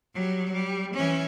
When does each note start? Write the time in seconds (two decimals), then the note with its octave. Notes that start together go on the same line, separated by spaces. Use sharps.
0.14 F#3 G3
0.53 G3
0.94 E3 C#4